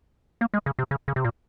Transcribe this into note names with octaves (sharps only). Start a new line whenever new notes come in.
A#3
G#3
C#3
C3
C#3
C#3
C3
A#2